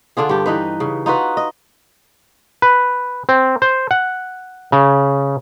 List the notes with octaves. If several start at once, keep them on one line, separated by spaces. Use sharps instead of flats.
D3 D4 F4 G#4
G2 G4
E3 D#4 B4
C#3
D#4 F4 F#4 B4
D#5
B4
C4
C5
F#5
C#3